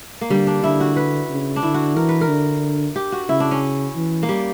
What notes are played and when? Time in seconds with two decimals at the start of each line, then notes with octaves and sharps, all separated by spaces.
0.21 A#3
0.30 D3 G3
0.47 D4
0.64 D3 E4
0.80 F#4
0.96 B4
1.30 C#3
1.56 D4
1.63 D3 E4
1.74 F#4
1.96 E3 A#4
2.09 B4
2.21 A#4
2.29 D3
2.96 G4
3.12 F#4
3.29 C#3 E4
3.40 D4
3.51 C#4
3.96 E3
4.23 A#3
4.29 G3